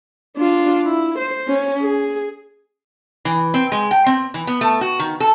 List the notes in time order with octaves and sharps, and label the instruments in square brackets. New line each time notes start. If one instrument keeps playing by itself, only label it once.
[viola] D4 F4
E4
C5
C#4
G#4
[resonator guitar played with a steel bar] E3
C4
G#3
G5
C4
E3
B3
A3
F#4
D#3
A4